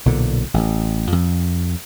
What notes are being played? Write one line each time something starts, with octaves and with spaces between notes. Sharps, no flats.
B1 A#2 D3
A1
F2